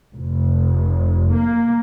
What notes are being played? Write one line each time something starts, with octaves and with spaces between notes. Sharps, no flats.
F1
A#3